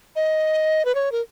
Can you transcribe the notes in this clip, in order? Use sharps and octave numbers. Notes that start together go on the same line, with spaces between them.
D#5
B4
C#5
A#4